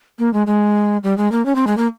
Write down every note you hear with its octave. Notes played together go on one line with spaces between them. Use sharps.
A#3
G#3
G#3
G3
G#3
A#3
C#4
C4
G#3
A#3